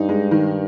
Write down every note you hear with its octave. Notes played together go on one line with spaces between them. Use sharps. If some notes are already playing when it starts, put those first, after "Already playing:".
Already playing: G2 D#4
G#3
D#3